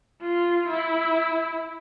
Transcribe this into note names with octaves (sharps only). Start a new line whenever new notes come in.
F4
E4